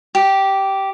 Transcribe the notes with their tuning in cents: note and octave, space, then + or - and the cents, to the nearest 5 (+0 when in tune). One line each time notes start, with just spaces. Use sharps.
G4 -10